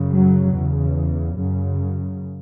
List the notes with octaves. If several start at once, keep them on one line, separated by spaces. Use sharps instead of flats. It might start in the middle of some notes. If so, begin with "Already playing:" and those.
Already playing: F#2 C#3
F#3
E2 C#3
F#2 C#3